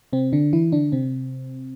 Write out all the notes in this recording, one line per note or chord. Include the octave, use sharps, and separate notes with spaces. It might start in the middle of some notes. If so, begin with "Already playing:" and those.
C3 C4
D3 D4
E3 E4
D3 D4
C3 C4